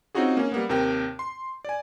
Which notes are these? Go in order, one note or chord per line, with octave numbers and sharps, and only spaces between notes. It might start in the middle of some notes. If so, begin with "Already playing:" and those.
C4 C#4 D#4 F4 F#4 G#4
A#3 C#4
G3 A#3 B3
D#2 C3 A#4 G5
C6
D5 G#5